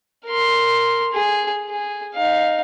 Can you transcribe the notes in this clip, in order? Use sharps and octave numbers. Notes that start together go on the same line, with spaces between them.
A#4 C6
G#4
G#4
D#4 F5